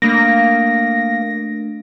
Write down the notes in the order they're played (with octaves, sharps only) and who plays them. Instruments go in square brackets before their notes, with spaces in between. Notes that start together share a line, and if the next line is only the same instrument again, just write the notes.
[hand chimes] A3 D4 D7 [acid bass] A#3 [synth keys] A#6